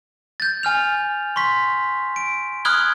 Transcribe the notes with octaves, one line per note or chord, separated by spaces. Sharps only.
G6 A6
G#5 F6 F7
C6 C#6 B6
D7
B5 D#6 F6 F#6 G#6 G7